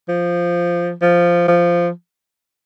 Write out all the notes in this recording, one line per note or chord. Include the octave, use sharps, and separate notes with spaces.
F3
F3
F3